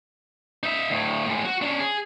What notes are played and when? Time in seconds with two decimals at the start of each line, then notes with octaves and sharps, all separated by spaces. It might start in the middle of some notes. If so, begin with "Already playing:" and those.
0.63 D#4 E5
0.90 D2 A2
1.26 A2 G#3
1.45 F#4
1.62 C#4 D4
1.80 G#4